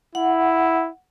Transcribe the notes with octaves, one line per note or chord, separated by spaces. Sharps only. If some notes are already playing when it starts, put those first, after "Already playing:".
E4 F#5